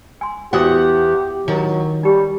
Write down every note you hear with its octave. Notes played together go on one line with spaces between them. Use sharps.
G#5 C6
E2 F#4 G4 C5 F#5 D#6
D#3 F#3
G3 D#4 G4